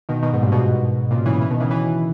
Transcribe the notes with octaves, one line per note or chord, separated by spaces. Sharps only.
B2 D#3
B2 D#3
G#2 B2
G2 A#2
G#2 B2
A#2 C#3
C#3 E3
C#3 E3
B2 D#3
C#3 E3
C#3 E3